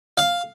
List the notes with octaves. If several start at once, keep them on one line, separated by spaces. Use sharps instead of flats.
F5